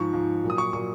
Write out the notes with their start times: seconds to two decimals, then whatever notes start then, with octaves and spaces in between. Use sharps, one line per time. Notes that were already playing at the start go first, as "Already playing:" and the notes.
Already playing: G#2 F3 C#6
0.13 G#2 F3
0.44 A#2 F#3
0.50 D#6
0.58 C#6
0.73 A#2 F#3 C#6